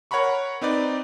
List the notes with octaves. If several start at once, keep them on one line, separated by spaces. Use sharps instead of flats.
A#4 C#5 F#5 A#5 B5 C#6
C4 D#4 B4 D5